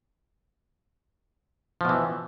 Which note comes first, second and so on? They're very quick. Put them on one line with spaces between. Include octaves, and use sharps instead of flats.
F3 B2 E3